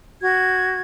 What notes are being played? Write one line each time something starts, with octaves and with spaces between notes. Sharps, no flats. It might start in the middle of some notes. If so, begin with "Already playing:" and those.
F#4 G#6